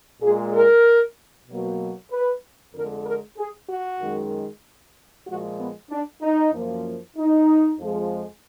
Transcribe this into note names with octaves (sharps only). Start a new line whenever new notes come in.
A#2 G#3 G#4
A#4
B2 F#3 A#3
B4
F2 D3 G#3 A#4
A#4
G#4
F#4
F#2 D#3 G#3
A#2 F3 G#3 F#4
B3
D4
D#4
F#2 F3 A#3
D#4
F2 F3 G#3